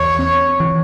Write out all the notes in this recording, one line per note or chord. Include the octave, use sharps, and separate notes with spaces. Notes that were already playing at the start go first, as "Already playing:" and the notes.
Already playing: E2 C#5
C4
E3